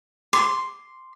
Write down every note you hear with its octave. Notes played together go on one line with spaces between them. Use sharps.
C6 D6